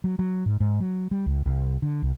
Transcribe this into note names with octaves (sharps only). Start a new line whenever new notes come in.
F#3
F#3
G#2
G#2
F#3
G3
C#2
C2
D3
C2